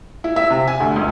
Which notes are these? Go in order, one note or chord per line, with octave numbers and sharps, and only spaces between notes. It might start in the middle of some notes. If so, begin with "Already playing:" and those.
E4
E5
C3
G#5
D2
C#2